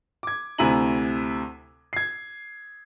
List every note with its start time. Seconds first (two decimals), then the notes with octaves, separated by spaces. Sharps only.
0.23 D6 G#6
0.58 D2 C3 E4 G#5 A#5 F#7
1.93 G#6 C7